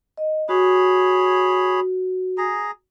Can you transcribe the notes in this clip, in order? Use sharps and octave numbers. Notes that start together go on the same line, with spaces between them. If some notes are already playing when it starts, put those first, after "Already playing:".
D#5
F#4 G#4 C#5 B5
G#4 A#5